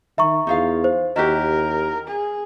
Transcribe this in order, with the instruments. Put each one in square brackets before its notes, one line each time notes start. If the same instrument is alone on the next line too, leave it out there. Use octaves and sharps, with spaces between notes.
[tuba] D#3 [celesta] E5 A#5 C#6
[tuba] E2 [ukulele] D#4 F4 F5
[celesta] C5
[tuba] D#2 [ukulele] E4 F#4 G4 [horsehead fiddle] A#4 [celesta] D#5
[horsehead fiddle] G#4